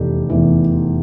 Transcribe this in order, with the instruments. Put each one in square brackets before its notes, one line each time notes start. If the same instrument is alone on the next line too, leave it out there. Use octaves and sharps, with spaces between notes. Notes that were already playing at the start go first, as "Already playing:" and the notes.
Already playing: [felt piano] F1 E2 E3 G4
F1 E2 E3